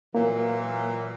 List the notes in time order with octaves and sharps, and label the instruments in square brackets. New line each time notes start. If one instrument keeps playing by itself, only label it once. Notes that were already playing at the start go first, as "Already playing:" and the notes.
[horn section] A#2 E3 F#3 [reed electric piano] A#3